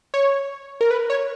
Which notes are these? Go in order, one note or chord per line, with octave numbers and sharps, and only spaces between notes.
C#5
A#4
B4
C#5